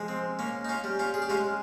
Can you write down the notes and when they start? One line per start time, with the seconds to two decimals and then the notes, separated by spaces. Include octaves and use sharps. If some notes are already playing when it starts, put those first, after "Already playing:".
Already playing: F3 G#3
0.08 C4
0.39 A#3 C#4
0.65 D#4
0.69 C#4 F4
0.84 G3
0.99 C#4 F4
1.14 G#4
1.22 G4
1.30 G#3 C#4 F4